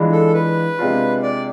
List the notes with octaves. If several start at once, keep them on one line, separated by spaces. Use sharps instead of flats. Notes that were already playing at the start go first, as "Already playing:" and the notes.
Already playing: E3 G#3 D4 F4
A4
B4
C3 G#3 D4 F4
D5